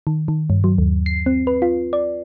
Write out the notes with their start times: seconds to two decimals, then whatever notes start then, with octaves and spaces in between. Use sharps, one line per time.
0.07 D#3
0.28 D#3
0.50 G2
0.64 F#3
0.78 D#2
1.06 C7
1.26 C4
1.47 B4
1.62 F4
1.93 D5